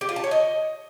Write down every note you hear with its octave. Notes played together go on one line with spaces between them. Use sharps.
G4
F4
A5
C#5
D#5